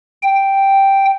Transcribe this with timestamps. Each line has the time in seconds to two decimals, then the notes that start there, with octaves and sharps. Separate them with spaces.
0.22 G5